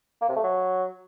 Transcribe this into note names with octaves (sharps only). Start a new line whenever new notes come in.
A#3
C3
A3
F#3